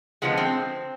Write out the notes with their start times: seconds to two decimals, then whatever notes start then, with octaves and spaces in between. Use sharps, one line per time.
0.22 D3 F3 G#3 B3
0.38 C4